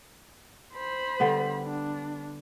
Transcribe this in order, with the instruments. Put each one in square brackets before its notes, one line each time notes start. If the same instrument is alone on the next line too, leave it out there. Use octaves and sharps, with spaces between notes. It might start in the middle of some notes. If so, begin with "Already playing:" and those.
[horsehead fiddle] C5 B5
[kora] D3 G3 B3
[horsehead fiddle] D4